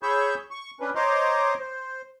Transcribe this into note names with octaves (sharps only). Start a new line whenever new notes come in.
G#4 C#5 B5 C#6 E6 G6
C#6
C#4 D4 B4
C5 C#5 D#5 A#5 C6 D6
C5